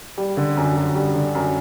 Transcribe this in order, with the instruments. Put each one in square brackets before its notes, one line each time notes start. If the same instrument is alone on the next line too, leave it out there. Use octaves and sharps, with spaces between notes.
[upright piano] G3
D3
F#2
F#2
G3
D3
F#2